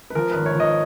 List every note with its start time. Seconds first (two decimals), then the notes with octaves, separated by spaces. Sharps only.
0.10 B4
0.15 F3 A#4
0.31 G#1 B4
0.46 C#5
0.55 F3 D#5